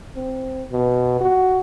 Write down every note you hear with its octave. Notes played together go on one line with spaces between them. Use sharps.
C4
B2
F#4